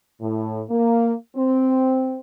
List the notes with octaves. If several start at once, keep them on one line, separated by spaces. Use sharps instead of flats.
A2
A#3
C4